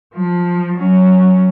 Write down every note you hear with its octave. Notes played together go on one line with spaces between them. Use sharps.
F3
F#3 C#4